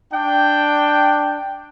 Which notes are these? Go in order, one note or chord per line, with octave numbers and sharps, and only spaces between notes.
D4 G5